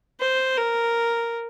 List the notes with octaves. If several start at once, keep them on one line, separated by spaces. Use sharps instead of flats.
C5
A#4